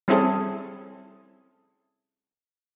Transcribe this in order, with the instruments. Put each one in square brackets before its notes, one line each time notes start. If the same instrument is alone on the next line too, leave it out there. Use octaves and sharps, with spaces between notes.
[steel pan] G3 C4 C#4 E4 G#4 A4